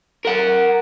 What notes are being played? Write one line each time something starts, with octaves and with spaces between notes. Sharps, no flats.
A#4 F#5